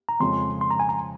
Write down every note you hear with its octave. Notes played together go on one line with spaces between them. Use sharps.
A#5
F2 C#3 G#3 C#4 C6
C6
A#5
G#5
A#5